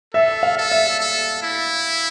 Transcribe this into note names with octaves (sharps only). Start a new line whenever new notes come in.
A4 E5
F5
A4
E5
A4
E4